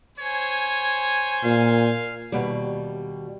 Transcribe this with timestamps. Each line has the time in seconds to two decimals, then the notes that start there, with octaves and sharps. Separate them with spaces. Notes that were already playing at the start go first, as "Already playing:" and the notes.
0.19 C5 C#5 G#5
1.44 A#2 F5
2.32 D#2 B2 G3